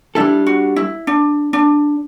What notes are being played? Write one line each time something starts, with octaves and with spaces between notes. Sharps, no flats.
G3 D4 E4 A4
F#4
E4
D4
D4